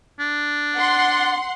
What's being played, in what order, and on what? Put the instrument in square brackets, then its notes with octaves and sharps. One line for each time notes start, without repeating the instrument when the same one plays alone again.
[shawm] D4
[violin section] F#5 C6